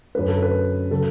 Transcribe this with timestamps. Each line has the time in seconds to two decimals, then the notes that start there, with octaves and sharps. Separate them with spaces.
0.15 F#2 D3 A3 B4
0.28 A4
0.43 B4
0.90 C#3 F#3 C#4 A4